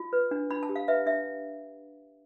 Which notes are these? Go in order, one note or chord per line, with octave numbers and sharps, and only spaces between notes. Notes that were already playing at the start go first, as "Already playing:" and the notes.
Already playing: F4
B4
D4
D4 B5
A5
G4
F5
B4 E5
D4 E5